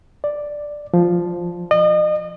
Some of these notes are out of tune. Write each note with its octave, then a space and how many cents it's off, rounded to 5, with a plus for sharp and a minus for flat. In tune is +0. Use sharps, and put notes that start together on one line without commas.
D5 +5
F3 +0
D#5 -35